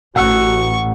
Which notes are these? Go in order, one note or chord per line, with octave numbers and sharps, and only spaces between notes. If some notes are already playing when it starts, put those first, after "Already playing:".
A1 F#4 F#5 C#6 E6 F#6